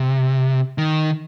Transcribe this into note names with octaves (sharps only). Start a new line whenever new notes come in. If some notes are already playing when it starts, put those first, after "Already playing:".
Already playing: C3
D#3